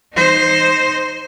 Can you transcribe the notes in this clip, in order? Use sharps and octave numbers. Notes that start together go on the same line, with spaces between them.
D#4 C5